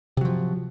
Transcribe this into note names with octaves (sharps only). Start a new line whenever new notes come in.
C3 F3 F#3